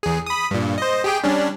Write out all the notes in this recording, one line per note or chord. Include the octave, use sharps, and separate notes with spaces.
E2 G#4
B5 D#6
G2 A#2
C5 D#5
G4 G#4 G5
G3 C#4 D4